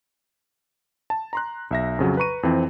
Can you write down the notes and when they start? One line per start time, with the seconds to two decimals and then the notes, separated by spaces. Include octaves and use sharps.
1.10 A5
1.33 A#5 C6 F#6
1.71 B1 E5 A#6
1.99 F2 C#3 F#3
2.17 B4 A#5 C#6 D#7
2.43 F2 E3 C4